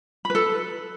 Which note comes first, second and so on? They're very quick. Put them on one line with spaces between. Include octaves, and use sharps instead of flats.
B5 B4 A4